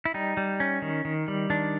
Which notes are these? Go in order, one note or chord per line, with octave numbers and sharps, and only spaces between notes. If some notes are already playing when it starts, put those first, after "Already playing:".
E4
G3 D#4
G3
C#4
D#3
D#3
G3
D#3 D4